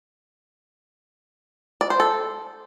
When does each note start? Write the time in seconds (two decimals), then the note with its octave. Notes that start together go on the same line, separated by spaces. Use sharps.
1.81 D5
1.90 C5
2.00 A4